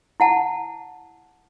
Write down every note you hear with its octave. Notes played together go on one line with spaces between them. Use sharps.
E4 F#5 A5